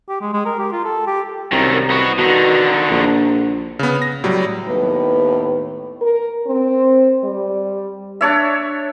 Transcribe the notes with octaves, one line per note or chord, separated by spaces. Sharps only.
G4
G#3
G#3
A#4
G4
F4
A4
G4
C2 F#2 D#3
B3 F#4
B2 D3 D#3
A#1
C#3 B3
A#6
A2 F#3 G3
D#2 A2 B3 B4
A#4
C4
G3
D4 C#5 E5